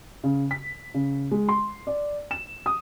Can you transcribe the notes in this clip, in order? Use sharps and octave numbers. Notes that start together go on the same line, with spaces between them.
C#3
B6
C#3
G#3
C6
D5
E7
D#6